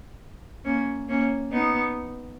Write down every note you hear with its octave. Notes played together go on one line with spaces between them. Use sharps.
A#3 C#4
A#3 C#4
B3 D#4